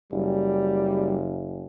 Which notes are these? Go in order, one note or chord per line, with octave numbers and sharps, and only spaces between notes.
F#1 G3